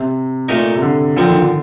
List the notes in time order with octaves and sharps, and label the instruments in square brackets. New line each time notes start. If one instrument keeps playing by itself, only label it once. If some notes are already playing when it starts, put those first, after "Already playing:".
Already playing: [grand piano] C3
[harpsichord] A#2 A3 D#4 A#4
[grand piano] C3
D3
[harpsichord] A#2 F3 C4 [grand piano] D3
[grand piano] D#3
D3